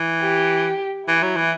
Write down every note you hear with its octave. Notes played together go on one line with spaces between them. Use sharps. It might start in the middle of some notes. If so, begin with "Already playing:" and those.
Already playing: E3
G4
E3 E4
F#3
E3